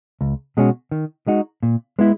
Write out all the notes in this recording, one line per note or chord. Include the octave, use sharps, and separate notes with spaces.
C#2
B2 G#3 C#4 F#4
D#3
G#3 D#4 F#4
A#2
G#3 B3 E4